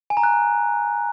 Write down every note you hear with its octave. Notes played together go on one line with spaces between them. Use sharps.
G#5
A#5
F#6